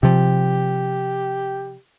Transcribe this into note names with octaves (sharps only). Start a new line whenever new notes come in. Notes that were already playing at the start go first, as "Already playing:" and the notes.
C3 F3 G4